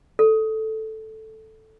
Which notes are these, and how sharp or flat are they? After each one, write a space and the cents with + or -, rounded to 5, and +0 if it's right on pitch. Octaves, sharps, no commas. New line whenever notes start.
A4 +0